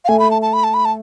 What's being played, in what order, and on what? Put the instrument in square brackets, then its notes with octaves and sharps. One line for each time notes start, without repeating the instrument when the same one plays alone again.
[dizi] F5
[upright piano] A3 [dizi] G#5
[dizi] B5
A5
A5
B5
A5
B5
A5